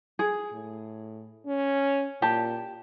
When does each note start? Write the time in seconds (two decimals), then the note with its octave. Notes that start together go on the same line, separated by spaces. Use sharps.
0.19 G#4
0.53 A2
1.46 C#4
2.22 A#2 G4 A5